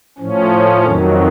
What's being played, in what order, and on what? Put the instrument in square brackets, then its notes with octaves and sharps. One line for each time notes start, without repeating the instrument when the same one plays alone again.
[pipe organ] A2 F3 C#4
F2 D#3 F#3